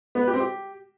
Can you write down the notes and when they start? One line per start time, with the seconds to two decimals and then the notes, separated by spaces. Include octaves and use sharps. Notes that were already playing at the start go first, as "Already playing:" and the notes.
0.15 B3
0.21 B4
0.27 G4
0.34 C4
0.40 G4